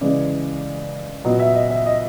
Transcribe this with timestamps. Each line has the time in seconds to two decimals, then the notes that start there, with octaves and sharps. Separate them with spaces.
0.01 C#3 E3 G#3 D5
1.25 A#2 F#3 B3 D#5
1.39 E5
1.55 D#5
1.71 E5
1.86 D#5